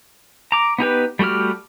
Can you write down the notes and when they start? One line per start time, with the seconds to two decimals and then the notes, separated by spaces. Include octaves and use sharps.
0.52 A#5 D6
0.78 B3 D#4 G4 B4
1.19 G3 A3 F#4 G4 F6